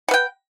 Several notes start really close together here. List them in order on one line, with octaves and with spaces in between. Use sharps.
F#5 B4 G5